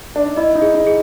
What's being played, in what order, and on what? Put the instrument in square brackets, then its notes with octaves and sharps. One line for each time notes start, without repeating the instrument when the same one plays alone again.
[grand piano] D4
D#4
[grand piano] E4 [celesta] D#5
[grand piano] D#4
[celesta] G#4
[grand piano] D#4
[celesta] G#4